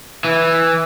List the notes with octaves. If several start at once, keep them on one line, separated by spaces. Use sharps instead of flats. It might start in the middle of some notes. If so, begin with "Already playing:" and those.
E3